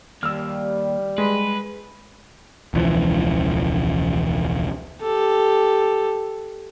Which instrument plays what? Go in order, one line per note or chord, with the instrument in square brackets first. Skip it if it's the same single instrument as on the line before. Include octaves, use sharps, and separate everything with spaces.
[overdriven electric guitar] D#2 [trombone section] G3 [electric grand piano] E6 F6
[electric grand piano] G#3 [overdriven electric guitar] B4
[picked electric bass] E1 C#2 E3 F3
[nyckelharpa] G4 A4